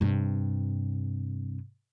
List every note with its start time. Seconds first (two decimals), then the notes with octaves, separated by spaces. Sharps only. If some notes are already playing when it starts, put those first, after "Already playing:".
0.01 G2 C3